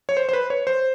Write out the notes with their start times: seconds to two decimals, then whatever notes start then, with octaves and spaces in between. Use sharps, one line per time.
0.09 C#5
0.17 C5
0.29 C5
0.33 B4
0.50 C#5
0.67 C5